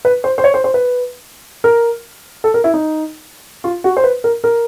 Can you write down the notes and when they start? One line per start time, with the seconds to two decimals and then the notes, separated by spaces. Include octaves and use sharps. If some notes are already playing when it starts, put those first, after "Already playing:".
0.05 B4
0.24 C5
0.38 C5
0.44 C#5
0.54 C5
0.64 C5
0.74 B4
1.64 A#4
2.44 A4
2.54 A#4
2.64 E4
2.74 D#4
3.64 F4
3.84 F#4
3.97 C5
4.04 B4
4.24 A#4
4.44 A#4